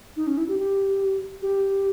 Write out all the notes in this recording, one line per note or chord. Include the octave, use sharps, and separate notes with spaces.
D#4
C#4
E4
G4
G4
G4